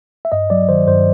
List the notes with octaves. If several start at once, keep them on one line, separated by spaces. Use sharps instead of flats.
E5
G2 D#5
F#3 D5
D#3 C5
G2 C5